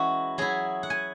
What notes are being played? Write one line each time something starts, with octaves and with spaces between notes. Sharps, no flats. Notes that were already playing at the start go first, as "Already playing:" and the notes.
Already playing: E3 G#3 C#4 E4 F#4
F#3 E4 G#4
F#5
G#5